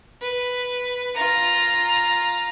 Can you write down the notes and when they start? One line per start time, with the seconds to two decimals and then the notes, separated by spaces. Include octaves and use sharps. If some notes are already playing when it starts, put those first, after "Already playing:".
0.20 B4
1.15 F4 A#5